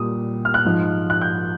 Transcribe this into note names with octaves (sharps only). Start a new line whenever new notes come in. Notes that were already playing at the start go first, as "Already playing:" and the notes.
Already playing: A#2 G3 D#6
F6
F#6
G#2 F3
F#6
G6